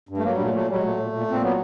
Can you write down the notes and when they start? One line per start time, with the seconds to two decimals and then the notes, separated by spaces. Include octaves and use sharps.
0.09 G2
0.17 A3
0.23 F#3 A#3
0.34 A#2 G3
0.43 A3
0.53 F#3 A3
0.67 F#3 G3
0.76 G#3
0.83 A#2 A3
0.98 A#2
1.12 A#2
1.27 A#2 C4
1.42 F#3 B3